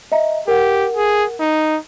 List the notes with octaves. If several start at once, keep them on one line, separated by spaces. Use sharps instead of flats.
D#5 E5 A#5
G4 A#4 F#5
G#4
D#4